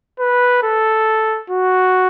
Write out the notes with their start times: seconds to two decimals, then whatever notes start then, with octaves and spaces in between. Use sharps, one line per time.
0.19 B4
0.63 A4
1.50 F#4